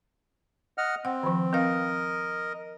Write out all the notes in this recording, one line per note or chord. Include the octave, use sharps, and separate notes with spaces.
D#5 F#5 F6
C4 F#5
D#3 F3
C4 A#4 B4 D#5 F5